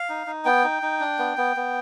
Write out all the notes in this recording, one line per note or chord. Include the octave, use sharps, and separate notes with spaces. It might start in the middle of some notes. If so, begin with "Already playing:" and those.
Already playing: F5
D#4
D#4
B3 G5
D#4
D#4
D4
B3
B3
B3